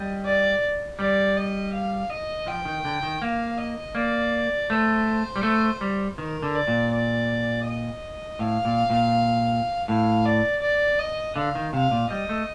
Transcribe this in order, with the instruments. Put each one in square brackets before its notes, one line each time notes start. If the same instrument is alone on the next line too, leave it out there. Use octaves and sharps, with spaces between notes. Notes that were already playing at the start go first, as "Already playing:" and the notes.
Already playing: [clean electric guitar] G3 [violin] D#5
[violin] D5
[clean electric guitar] G3 [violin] D5
[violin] D#5
F5
D#5
[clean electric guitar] F3 [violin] G5
[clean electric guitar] D#3
D3
D#3
[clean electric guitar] A#3 [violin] F5
[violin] D#5
[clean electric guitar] A#3 [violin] D5
[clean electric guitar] A3 [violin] C5
[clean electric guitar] G3
A3
G3
[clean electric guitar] D#3 [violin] A#4
[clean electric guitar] D3
[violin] D5
[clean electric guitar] A#2
[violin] D5
D#5
[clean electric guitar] A2 [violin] F5
[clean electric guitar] A#2
A#2
[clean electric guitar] A2 [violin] F5
[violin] D5
D5
D#5
[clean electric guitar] D3 [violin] F5
[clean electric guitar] D#3
[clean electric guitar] C3 [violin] F5
[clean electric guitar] A#2
[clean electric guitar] G3 [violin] D#5
[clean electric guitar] A3